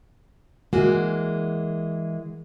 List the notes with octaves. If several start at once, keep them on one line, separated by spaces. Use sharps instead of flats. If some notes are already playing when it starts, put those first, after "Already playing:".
E3 G#3 A#3 F#4